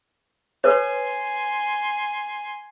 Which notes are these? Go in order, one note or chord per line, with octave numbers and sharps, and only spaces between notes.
A4 B4 C#5 G#5 C6